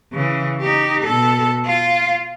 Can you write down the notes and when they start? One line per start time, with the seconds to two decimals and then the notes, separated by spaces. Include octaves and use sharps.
0.12 C#3 E3
0.61 D#4 G4
1.04 B2 A4
1.65 F4